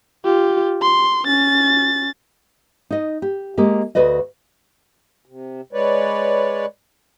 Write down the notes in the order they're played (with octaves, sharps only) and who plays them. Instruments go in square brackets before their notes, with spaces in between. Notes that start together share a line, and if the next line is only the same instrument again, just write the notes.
[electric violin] F4 G4
C6
C#4 A6
[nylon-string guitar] D#4 D#5
G4
G#3 A#3 G4
D2 F#4 B4 D5 D#5
[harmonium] C3
G#3 B4 C#5 D5